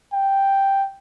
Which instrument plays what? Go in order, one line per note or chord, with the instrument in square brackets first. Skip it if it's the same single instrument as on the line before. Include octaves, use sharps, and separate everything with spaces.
[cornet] G5